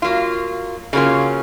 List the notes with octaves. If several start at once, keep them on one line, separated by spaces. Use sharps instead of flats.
F#3 A#3 F4
C#3 F#3 A#3 C#4 F4